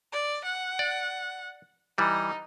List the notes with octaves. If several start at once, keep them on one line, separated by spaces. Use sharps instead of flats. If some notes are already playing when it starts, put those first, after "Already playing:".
D5
F#5
D5
E3 G3 D#4